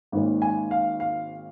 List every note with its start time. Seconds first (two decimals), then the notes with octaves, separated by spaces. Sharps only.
0.12 G#1 G#2 D#3 A#3 C#4
0.42 G#5
0.71 F5
1.00 F5